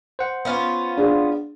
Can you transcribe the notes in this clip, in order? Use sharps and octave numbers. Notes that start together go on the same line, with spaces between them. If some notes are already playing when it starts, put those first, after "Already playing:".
C5 F#5
B3 C#4 F4
D4 G#4